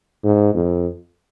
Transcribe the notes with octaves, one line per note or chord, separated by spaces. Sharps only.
G#2
F2